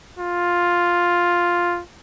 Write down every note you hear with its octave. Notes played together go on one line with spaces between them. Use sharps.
F4